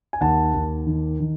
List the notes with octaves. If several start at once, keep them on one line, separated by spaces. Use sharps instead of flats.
G#5
D#2 F#5 A5
D#2
D#3
D#3